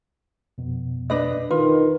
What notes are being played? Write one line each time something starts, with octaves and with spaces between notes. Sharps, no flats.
F2 B2
D4 B4 D#5
D#3 F4 B4